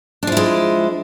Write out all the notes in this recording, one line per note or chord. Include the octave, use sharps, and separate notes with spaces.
F3 G#3 D4 E4